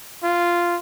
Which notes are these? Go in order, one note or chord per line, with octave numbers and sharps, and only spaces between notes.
F4